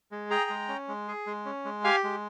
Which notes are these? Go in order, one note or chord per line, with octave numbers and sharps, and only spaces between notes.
G#3
G#4 G5 A#5
G#3
C#4
G#3
G#4
G#3
C#4
G#3
G4 F5 G#5
G#3